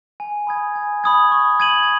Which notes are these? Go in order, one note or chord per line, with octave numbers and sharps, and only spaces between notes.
G#5
B5 D#6 G#6
G#5
B5 D#6 G#6
C#6
G#6 D#7 F#7